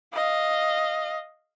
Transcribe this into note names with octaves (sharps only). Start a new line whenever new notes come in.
D#5 F5